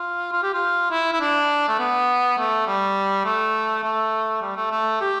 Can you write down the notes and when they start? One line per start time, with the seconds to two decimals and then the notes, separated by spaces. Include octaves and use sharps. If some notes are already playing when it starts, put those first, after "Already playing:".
Already playing: F4
0.32 F4
0.43 G4
0.53 F4
0.91 E4
1.13 E4
1.20 D4
1.68 A3
1.79 B3
2.38 A3
2.67 G3
3.25 A3
3.83 A3
4.42 G3
4.57 A3
4.71 A3
5.01 G4